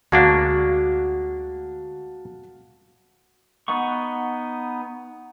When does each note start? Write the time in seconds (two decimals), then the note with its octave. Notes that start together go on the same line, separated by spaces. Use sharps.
0.12 D2 G#3 A#3 D4 F#4 F5 F#5 A5
3.68 B3 D#4 F#5 C#6